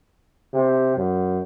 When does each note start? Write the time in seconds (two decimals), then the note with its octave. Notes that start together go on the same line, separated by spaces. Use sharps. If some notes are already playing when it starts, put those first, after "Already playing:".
0.53 C3
0.96 F#2